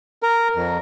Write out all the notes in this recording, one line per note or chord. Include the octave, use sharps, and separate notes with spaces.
A#4
F2